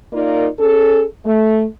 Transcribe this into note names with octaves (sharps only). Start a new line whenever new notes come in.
A#3 D#4 F4 A#4 D5
C#4 G#4 A4
A3